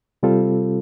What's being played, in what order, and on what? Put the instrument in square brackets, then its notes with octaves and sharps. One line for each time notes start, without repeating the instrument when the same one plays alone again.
[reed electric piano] C3 G3 C4 F4 A4